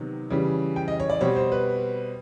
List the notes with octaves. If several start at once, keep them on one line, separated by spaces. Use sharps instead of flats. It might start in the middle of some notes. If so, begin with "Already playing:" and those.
Already playing: C3 D#3 F#3 B3 D#4
C#3 E3 G3
G5
D#5
C#5
D5
B2 G3 C4 C#5
C5
B4